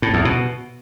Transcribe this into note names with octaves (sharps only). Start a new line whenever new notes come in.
A2
E2
B2